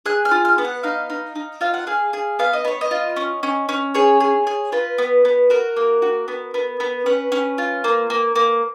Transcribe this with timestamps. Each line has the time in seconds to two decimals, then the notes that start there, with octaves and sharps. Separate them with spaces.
0.06 G#4 F#6
0.25 F6
0.31 F4
0.45 F6
0.58 B3
0.65 F#5
0.83 D#4 F5
1.10 D#4
1.35 D#4
1.61 F4 F5
1.74 F#5
1.87 G#4 F5
2.13 G#4
2.39 B3 F5
2.53 D#5
2.65 B3 C#5
2.81 D#5
2.91 F4
3.16 C#4
3.43 C#4
3.69 C#4
3.94 G#4 C#5
4.20 G#4
4.47 G#4
4.72 F4 B4
4.98 B3
5.25 B3
5.50 F#4 A#4
5.76 A#3
6.02 F#4
6.28 B3
6.54 B3
6.80 B3
7.06 C#4 B4
7.32 C#4
7.58 F4
7.84 A#3
8.10 A#3
8.35 A#3